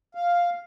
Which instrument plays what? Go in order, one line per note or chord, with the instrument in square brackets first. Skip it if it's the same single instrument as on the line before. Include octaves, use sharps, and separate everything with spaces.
[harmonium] F5